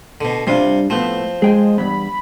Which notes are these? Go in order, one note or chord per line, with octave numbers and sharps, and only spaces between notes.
B2 D3
G2 C3 G3 D4 F4
A2 F3 A3 B3 C4
G#3 G#4 G5 G#5
E2 G2 B5